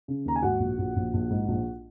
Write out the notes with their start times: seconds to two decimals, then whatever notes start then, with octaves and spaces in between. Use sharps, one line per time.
0.08 C#3
0.25 D#2 A#5
0.36 G#5
0.42 G#2 F#4 F#5
0.60 A#1
0.78 A#1
0.96 A#1
1.14 A#1
1.30 G#2
1.48 A#1